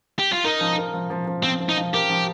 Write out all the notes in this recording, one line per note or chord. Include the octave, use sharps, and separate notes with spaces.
G4
F4
D#4 A#4
F3
A#4
F3
F3
F3
F3 C4
F3
D#4
F3
G4 A#4
F3